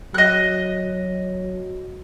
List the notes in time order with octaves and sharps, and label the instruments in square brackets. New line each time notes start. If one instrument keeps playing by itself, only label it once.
[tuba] F#3 [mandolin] D#5 F#6